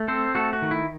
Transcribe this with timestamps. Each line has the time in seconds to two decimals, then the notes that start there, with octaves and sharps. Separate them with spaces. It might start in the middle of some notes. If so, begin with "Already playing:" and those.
Already playing: A3
0.08 C4 A4 C5
0.35 A3 F#4 A4
0.53 F#4
0.62 D#3
0.71 E4